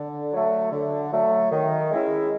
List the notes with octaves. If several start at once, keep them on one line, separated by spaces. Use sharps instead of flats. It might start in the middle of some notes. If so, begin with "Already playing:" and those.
Already playing: D3
F#3 A3
D3
F#3 A3
D#3
G#3 C#4 E4